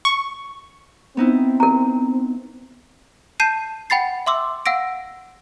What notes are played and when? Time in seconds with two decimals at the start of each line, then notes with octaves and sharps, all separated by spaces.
0.05 C#6
1.17 B3 C4 D#4 E4
1.60 A#4 A#5
3.40 A5 G6 C7 D#7 E7
3.90 F#5 G5 B5 A6 C7
4.26 E5 C6 D6 E6
4.66 F5 F#5 E6 A#6 D7